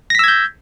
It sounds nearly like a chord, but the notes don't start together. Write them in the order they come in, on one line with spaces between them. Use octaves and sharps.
A#6 B6 E6 G#6 G6